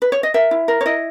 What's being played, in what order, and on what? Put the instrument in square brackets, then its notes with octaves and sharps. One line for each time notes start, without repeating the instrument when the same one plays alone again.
[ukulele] B4
C#5
D#5
A#4 E5
E4
A#4
C#5
E4 D#5